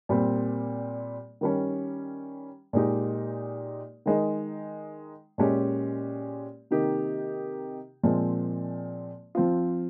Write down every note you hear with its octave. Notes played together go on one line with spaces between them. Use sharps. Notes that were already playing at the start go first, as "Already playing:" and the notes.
A#2 G3 C4
D#3 G3 C#4
A#2 G#3 D#4 G4
D#3 G#3 D#4
A#2 G#3 C#4 G4
C3 D#3 A#3 D#4 G4
A#2 F3 G#3 C4
F3 C4 F4